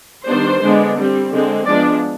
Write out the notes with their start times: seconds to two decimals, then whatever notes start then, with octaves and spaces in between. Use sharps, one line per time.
0.26 D#3 G3 B3 D4 C5
0.62 D3 G#3 B3 D4
0.97 G3 C4
1.32 D3 G#3 C4
1.67 F3 G#3 B3 D4 D5